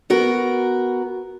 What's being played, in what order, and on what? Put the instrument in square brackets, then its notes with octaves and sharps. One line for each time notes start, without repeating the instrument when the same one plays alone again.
[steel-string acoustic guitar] B3 F#4 A#4